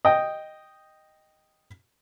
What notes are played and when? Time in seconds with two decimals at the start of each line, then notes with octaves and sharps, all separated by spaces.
0.05 D#5 G5